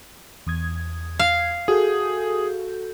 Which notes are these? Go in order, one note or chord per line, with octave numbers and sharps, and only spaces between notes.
E2 D#6 G#6
F5
F#4 G#4 A4 G6